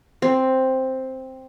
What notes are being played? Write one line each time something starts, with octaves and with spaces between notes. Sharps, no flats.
C4